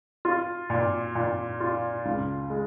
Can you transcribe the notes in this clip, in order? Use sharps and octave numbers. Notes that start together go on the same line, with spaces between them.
F4
A#2
A#2
F4
C#2
G#3